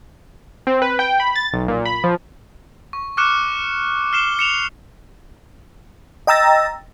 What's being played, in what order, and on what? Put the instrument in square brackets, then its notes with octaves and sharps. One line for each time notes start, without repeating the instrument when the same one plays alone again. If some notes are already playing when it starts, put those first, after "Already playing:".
[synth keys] C4
B4
G5
B5
A6
B1
A#2
B5
F3
[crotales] C#6
C#6 D6 F6 F#6 C#7 E7
F6 C7 E7 G7
C#7 E7 F7
[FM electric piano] D#5 G5 A#5 E6 A6 A#6